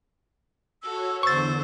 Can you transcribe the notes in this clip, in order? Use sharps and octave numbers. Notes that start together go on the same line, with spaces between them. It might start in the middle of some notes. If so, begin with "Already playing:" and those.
F#4 A4 C#5 E6
E2 D3 C5 C#6 A6